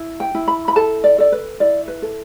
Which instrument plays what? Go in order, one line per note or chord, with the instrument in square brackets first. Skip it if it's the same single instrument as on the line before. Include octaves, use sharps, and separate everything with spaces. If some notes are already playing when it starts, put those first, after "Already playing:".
Already playing: [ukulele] E4
G5
E4
B5
B5
A4 A5
D5
A4 D5
B4
E4 D5
B4
A4